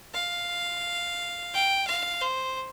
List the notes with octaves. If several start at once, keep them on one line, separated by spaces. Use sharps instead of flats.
F5
G5
F5
C5